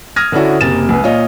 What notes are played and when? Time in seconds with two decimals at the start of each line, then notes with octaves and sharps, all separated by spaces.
0.16 D#6 F6 G#6 A#6
0.32 D3 C#4 D4 E4 F#4
0.61 F#1 C3 A#3 A6 E7
0.89 C#2 B4
1.03 A#2 F4 C#5 D#5